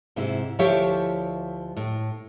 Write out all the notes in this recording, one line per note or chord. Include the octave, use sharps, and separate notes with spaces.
G#2 C3 E4
D2 F3 E4 G4 C#5 E5
A2